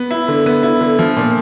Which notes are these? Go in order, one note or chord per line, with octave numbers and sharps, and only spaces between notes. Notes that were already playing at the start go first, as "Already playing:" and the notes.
Already playing: B3
E4
D3
B3
E4
D3
F3
A#2